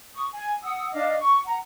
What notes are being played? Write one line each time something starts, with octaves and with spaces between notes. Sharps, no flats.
C#6 D#6
G#5
F#5 D#6 E6
D4 D#5 F5 D6
C#6
F#5 A#5